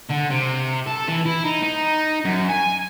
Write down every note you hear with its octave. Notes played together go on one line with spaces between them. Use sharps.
D3
C3
A4
E3
E4
D#4
D#4
F#2
G#5